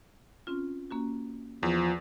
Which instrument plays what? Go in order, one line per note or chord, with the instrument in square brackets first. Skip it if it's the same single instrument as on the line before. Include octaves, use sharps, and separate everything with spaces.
[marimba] C4 C#4 F4
A#3 C#4 F#4
[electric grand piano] E2 [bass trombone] F3